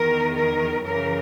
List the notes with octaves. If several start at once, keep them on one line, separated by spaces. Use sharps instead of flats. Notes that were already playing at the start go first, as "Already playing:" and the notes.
Already playing: E2 D#3 A#4
A#4
F#2 C#3 E3 A#4